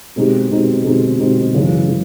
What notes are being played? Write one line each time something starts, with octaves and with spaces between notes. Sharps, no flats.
B2 G#3 C4 D#4 G4
B2 G#3 C4 D#4 G4
B2 G#3 C4 D#4 G4
B2 G#3 C4 D#4 G4
F#2 C#3 E3 G#3
C#3 E3 G#3